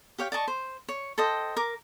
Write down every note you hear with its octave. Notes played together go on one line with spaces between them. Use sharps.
G4 C#5 F5 G5
D5 D#5 A5 C#6
C5
C#5
A4 C5 D#5 G5
A#4 D6